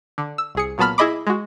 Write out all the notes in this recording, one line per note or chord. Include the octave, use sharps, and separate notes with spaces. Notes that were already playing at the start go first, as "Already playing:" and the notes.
D3
E6
C2 G#4 C#7
A#2 F#3 B3 A5 B5 F6
E4 G#4 D#5 B5 D6
G#3 F#4